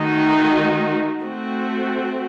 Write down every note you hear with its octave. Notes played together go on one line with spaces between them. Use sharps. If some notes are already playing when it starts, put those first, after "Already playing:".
Already playing: D#3 A3 D#4 F#4
A3 C4 F#4